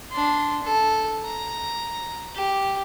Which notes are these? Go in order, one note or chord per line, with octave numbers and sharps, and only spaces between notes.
D4 C6
A4
A#5
G4